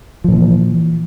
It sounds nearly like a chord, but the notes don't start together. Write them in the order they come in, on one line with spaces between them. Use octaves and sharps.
F3 A#2 E3